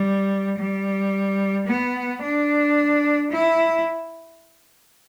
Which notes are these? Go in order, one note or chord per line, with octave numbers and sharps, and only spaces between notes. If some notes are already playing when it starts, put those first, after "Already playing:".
Already playing: G3
G3
B3
D4
E4